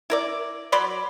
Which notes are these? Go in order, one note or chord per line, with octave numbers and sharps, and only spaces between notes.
E4 A#4 D5
F#3 D5 B5 C6